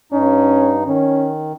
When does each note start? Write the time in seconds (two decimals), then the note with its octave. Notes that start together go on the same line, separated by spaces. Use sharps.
0.12 G2 C#4 D#4
0.85 D#3 C#4